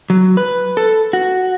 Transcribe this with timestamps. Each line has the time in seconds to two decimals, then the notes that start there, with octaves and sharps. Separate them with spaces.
0.10 F#3
0.37 B4
0.77 A4
1.13 F#4